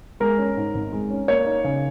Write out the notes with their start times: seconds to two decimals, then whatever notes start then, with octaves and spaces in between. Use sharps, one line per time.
0.20 G#3 A#4
0.38 C#4
0.57 G#2
0.74 G#1
0.92 G#3
1.10 C#4
1.28 A#3 C#5
1.46 D#4
1.64 C#3